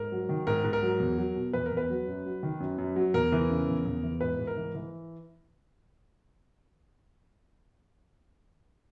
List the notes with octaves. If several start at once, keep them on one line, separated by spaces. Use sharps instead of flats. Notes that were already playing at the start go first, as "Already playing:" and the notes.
Already playing: G#2 A#4
F#3
D#3
G#2 A#4
G#2
A#4
F#3
E2
F#3
B2
E2 B4
A#4
E2
B4
F#3
F#2
F#3
D#3
F#2
F#2
F#3
E2 A#4
E3
C#3
E2
E2
E3
G#2 B4
G#2
A#4
E3
E3